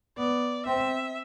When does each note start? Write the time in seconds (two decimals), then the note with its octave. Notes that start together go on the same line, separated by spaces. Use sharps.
0.18 B3 D5
0.66 C4 E5